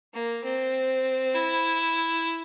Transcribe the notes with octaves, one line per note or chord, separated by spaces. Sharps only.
A#3
C4
E4